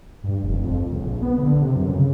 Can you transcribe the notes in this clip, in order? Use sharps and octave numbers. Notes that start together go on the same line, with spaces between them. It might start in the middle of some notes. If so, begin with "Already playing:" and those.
G2
F1
F2
C#2
A#1
B3
D3
C3
F#2
C#3